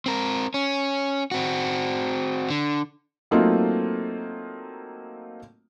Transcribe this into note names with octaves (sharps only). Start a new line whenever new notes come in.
C4 A#4
C#4
C4 F#4
D3
F#3 A3 A#3 C4 D#4 F4